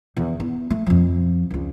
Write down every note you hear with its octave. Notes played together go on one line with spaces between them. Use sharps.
E2 D3
B3 E4
A3
F2 F3
C#2 F4